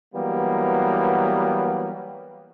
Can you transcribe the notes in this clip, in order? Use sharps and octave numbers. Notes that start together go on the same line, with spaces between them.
E3 F#3 G3 A#3 B3